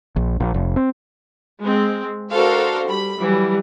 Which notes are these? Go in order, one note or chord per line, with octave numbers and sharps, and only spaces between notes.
A#1
A#1
F1
C4
G#3 C4
D4 F#4 A4 A#4 C5 F5
G3 B5
E3 F#3 G3